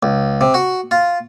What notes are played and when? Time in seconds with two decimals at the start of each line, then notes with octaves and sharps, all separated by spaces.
0.03 C#2
0.41 C3
0.54 F#4
0.91 F4